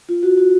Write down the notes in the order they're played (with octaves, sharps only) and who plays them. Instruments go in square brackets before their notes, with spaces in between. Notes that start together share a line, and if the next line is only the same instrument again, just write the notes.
[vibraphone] F4
F#4
F#4